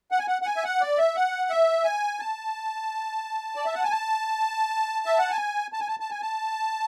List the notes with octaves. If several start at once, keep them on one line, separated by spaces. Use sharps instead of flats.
F#5
G#5
F#5
F#5
G#5
E5
F#5
D5
E5
F#5
E5
G#5
A5
D5
E5
F#5
G#5
A5
E5
F#5
G#5
A5
G#5
A5
A5
G#5
A5